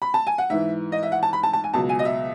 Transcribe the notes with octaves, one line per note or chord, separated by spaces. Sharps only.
B5
A5
G#5
F#5
G#2 E3 E5
D#5
E5
F#5
A5
B5
A5
A5
G#5
C#2 B2 F#3 A5
G#5
D#5
E5